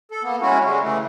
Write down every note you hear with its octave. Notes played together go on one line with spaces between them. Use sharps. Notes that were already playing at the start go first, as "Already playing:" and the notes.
A4
A#3 B3
G#3 C#4 E4 F#4
D3 G3 G#3
C#3 E3 A3